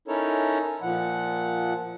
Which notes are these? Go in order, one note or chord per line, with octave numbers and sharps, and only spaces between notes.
C#4 D#4 E4 A4 A#4 C#5
A#2 F3 F#5